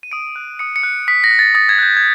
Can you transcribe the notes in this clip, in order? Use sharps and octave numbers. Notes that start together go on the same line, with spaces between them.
D#7
D#6 D7
F#6
D#6 C#7
C#7
F#6
D#6 B6
A#6
F#6
A6
D#6 A6
G#6
F#6 G6
G#6